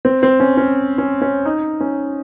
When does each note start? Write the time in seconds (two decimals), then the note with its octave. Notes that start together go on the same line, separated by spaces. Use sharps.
0.05 C4
0.23 C4
0.40 C#4
0.57 C#4
0.98 C#4
1.22 C#4
1.45 D#4
1.80 C#4